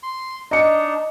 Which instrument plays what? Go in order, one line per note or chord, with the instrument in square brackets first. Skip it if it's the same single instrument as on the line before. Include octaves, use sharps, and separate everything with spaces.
[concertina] C6
[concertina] D4 D#4 [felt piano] D#5 C#7